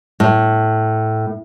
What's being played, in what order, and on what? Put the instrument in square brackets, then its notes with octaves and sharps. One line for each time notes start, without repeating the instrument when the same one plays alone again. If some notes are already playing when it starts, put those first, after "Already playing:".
[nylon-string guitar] A2